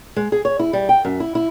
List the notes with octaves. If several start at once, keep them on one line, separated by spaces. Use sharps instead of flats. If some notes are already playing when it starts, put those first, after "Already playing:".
G#3
G#4
C#5
E4
G3
G5
F#2
E4
E4